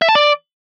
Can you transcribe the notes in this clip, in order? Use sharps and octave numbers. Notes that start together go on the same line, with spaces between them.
E5
A5
D5